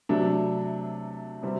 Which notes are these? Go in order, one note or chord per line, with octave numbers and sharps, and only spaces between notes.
C3 F#3 A3 D4
C3 G3 C4 F#4